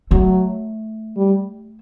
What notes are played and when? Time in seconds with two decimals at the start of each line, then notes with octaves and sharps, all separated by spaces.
0.11 F#3 A3
1.16 G3